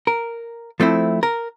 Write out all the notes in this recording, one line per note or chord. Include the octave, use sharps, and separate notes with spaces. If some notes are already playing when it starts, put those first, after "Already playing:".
A#4
F3 A3 C4 E4
A#4